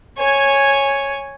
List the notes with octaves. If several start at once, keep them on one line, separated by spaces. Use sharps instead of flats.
C#5 G#5